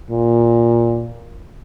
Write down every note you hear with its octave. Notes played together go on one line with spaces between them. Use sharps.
A#2